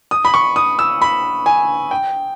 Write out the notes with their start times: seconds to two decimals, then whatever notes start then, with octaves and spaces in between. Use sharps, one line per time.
0.11 D#6
0.25 B5
0.34 C#6
0.56 D#6
0.79 E6
1.02 B5
1.46 G#5
1.91 G5